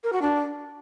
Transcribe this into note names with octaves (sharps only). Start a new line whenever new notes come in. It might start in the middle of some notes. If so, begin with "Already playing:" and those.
A#4
F#4
D4